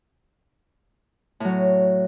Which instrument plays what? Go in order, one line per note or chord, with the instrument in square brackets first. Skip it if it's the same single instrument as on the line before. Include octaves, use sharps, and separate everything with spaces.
[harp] A2 F#3